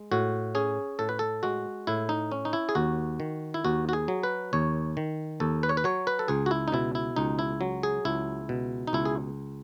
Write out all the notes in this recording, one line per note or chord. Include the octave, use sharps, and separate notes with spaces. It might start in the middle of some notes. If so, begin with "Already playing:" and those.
Already playing: G#3
A2 F#4
C#4 G#4
A2 A4
B4
A4
G#3 F#4
A2 E4
D#4
C#4
D#4
E4
G#4
D#2 F#4
D#3
E4
D#2 F#4
F#4
G#4
F#3
B4
D#2 C#5
D#3
D#2 A4
B4
C#5
B4
F#3 C#5
B4
A4
C#2 G#4
F#4
E4
D#4
B2 E4
E4
C#2 D#4
E4
F#3
G#4
C#2 E4
B2
D#4
C#2 E4
G#4